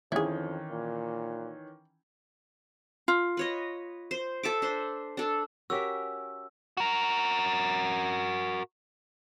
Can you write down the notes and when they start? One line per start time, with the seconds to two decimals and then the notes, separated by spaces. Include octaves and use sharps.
0.12 F2 D#3 E3 C#4 E4 G#4
0.72 A#2
3.08 F4
3.37 B4 C#5 D#5
4.11 C5
4.43 A4 E5 D6
4.62 D4 C5
5.17 D4 A4
5.70 C#4 F#4 G4 A#4 E5 E6
6.77 F#4 A#4